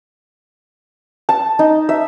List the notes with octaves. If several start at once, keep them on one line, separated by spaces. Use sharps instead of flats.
A5
D#4
E5